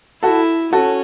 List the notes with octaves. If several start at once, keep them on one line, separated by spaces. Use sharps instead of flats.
E4 F#4 A4
C#4 F#4 A4